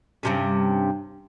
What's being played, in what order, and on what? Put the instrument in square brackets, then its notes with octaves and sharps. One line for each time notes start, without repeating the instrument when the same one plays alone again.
[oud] G2 C3 C#4